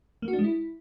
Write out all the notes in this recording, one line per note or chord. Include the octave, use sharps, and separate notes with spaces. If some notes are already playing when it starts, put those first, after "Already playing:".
A#3
F#4
D4
G#3
E4